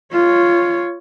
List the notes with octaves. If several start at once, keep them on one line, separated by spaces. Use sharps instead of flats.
F4 C#5